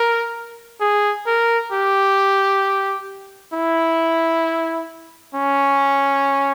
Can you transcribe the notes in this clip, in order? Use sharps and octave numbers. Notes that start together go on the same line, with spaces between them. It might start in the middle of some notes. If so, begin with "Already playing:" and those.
Already playing: A#4
G#4
A#4
G4
E4
C#4